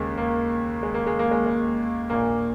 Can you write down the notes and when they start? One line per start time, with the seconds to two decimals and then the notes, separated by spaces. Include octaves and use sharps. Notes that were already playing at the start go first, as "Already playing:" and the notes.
Already playing: D#2 C#3 G#3 A#3
0.18 A#3
0.83 G#3
0.94 A#3
1.07 G#3
1.19 A#3
1.31 G#3
1.46 G#3
2.10 A#1 A#2 A#3